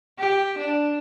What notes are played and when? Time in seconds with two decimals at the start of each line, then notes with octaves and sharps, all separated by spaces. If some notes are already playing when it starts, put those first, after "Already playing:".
0.19 G4
0.58 D4